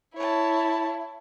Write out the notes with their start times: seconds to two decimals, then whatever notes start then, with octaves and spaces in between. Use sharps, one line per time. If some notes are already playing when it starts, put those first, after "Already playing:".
0.16 E4 C#5 A5